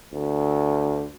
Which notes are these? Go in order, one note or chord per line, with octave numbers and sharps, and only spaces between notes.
D2